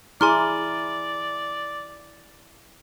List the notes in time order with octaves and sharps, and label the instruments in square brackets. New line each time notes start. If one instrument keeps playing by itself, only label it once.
[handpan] E4 [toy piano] G#4 A#5 [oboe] D5 [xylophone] G#5 C6 F6